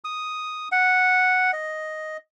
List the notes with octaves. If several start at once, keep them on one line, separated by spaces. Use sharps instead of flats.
D#6
F#5
D#5